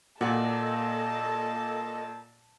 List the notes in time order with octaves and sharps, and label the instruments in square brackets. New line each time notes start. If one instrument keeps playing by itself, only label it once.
[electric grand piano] A#2 [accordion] A#3 A4 D#5 [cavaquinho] F#4 D5 [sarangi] A5